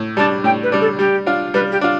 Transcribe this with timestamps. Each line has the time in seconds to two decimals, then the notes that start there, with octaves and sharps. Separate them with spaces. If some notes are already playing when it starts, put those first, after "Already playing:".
Already playing: A2
0.17 G3 D4 A5
0.44 A2 G5
0.63 B4
0.72 G3 D4
0.81 A4
0.99 G3 G4
1.26 D4 F4
1.54 G3 B4
1.72 G4
1.81 D4 F4